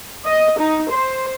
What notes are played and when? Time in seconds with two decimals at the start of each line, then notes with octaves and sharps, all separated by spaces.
0.24 D#5
0.59 D#4
0.90 C5